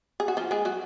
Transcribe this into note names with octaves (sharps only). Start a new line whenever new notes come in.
G#4
F#4
F3 F4
G#3 G#4
F#3 F#4